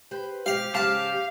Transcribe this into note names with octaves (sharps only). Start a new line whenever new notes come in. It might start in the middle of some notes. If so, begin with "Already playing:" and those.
G4 B4 C5
F2 G#2 B2 G4 F5
G#2 C#3 F5 A5